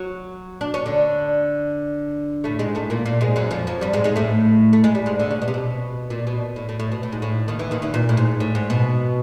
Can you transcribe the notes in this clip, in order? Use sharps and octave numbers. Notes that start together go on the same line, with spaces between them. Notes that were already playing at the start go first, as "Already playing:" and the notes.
Already playing: F#3 F#4
D4
C#4
D3 D4
A2 A3
G#2 G#3
A2 A3
A#2 A#3
A#2 A#3
G#2 G#3
F#2 F#3
F2 F3
F2 F3
G2 G3
G#2 G#3
G#2 G#3
A2 A3
A3
G#3
G3
G#2 G#3
D2 D3
C#3
B2
C3
B2
A#2
B2
A2
A2
A2
B2
A2
G#2
A2
D#2 D#3
E2 E3
D#2 D#3
E2 E3
A#2
A2
G#2
A2
G#2
B2